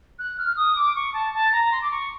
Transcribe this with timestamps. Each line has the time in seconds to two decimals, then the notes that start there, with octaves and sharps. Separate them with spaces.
0.19 F#6
0.38 F6
0.57 D#6
0.76 D6
0.96 C#6
1.14 A5
1.33 A5
1.52 A#5
1.72 C6
1.81 D6
1.91 C#6